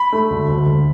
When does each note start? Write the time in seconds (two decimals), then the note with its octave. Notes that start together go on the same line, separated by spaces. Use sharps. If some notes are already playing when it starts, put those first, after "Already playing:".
Already playing: B5
0.12 A3
0.30 D2
0.48 D2
0.66 D2